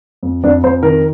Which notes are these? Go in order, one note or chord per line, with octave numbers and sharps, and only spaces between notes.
F2
F2 D4
F2 C5
D#3 A#4